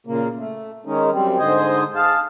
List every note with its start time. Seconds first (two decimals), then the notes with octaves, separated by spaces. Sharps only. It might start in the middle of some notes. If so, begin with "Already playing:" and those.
0.07 A#2 C#3 A#3
0.38 A3
0.85 D#3 G#3 C#4 D#4
1.12 F#2 G3 C4
1.39 G#2 D3 C5 D#5 G#5
1.96 G#4 F5 A5